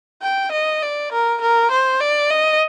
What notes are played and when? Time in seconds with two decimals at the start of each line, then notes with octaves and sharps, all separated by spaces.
0.22 G5
0.52 D#5
0.82 D5
1.12 A#4
1.41 A#4
1.71 C5
2.00 D5
2.30 D#5